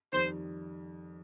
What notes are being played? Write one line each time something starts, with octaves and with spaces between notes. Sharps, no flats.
F2 D#3 G3 C5